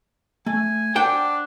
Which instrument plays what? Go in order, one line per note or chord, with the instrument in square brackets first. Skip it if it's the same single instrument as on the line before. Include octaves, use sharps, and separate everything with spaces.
[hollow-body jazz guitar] A3 [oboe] G#5
[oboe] D4 [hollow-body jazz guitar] C5 F#5 G5